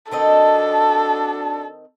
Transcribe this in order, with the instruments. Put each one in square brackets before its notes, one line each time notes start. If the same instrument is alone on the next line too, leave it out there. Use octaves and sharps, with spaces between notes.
[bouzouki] D#3 C4 D#5 [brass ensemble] D4 F#4 A5 [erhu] A4